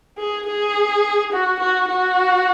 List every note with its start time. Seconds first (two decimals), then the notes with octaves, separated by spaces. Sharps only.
0.18 G#4
0.47 G#4
1.32 F#4
1.60 F#4
1.88 F#4